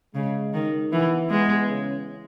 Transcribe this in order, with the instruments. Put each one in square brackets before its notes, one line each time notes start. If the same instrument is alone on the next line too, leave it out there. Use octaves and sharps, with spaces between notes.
[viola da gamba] C#3 [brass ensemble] G#3
[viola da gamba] D#3
[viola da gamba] E3 [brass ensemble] B3
[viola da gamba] G#3 [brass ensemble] B3
[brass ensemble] C#3